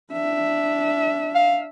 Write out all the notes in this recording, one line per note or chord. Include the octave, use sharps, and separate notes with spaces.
D4 E5
F5